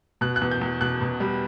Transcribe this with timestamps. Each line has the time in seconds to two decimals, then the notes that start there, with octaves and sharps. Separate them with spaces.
0.21 B2 F#6
0.36 F#6
0.42 E2
0.51 G6
0.61 E2
0.81 B2 F#6
1.01 B2
1.20 G3